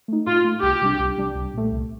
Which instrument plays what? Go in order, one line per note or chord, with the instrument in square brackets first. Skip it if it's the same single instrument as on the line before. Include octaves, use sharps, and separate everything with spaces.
[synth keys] A3 D#4
[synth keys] A2 [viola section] F4
[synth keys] A3 D#4
[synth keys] C2 [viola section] G4
[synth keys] C3 G3 D4
C2
C3 G3 D4
C2
A#2 A3
C2